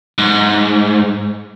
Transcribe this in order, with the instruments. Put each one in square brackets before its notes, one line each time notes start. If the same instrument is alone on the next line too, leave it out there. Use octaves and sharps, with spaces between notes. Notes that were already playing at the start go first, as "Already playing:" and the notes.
[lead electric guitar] G#2